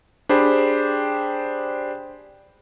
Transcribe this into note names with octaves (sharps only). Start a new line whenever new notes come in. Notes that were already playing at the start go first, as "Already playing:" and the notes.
D4 G4 G#4 C5 G5 B5